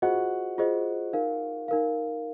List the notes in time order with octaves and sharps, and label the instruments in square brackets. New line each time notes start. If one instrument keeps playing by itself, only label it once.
[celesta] F4 G#4 C5 D#5 [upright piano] F#4 F#5
[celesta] F4 G#4 C5 D#5
D#4 A#4 F5
D#4 A#4 F5